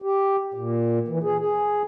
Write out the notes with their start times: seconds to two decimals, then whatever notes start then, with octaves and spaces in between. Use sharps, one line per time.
0.02 G4
0.54 A#2
1.08 E3
1.23 G#4
1.39 G#4